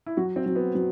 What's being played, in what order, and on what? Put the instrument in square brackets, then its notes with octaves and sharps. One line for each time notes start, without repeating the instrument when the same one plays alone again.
[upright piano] E4
[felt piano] F#3 [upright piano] F#4
[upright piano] C4
[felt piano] F#3
[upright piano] B3
[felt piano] F#3